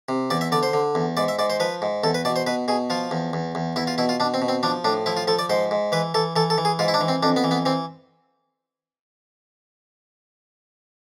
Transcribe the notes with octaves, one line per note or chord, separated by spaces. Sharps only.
C3
E2 D5
E5
D3 D5
C5
D3
E2
G#2 D5
E5
G#2 D5
C5
F3 B4
G#2
E2 A4
B4
B2 D5
C5
B2 B4
B2 G#4
F3 F4
E2
E2
E2
E2 E4
F4
B2 E4
F4
B2 D4
C4
B2
C4
F3 D4
A2 D4
F3 E4
F4
F3 A4
D5
G#2 C5
G#2
E3 B4
E3 A4
E3 A4
A4
E3
G#4
G#2 F4
E4
D4
E3
C4
F2 D4
B3
E3
B3
E3 C4